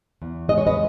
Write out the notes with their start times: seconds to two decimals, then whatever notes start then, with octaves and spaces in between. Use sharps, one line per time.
0.22 E2
0.48 G#3 D#5
0.58 C#5
0.67 B4 D#5